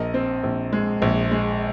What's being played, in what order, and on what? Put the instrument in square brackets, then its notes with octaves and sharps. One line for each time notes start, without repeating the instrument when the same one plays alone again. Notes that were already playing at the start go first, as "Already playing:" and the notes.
Already playing: [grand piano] A#1 A#4 D#5
C4
A#1
G#3
A#1
G#3